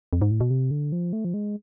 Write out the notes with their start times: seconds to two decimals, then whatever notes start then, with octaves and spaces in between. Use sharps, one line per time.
0.13 F2
0.22 G#2
0.31 A2
0.40 B2
0.50 C3
0.71 D3
0.92 F3
1.13 A3
1.25 F3
1.34 G#3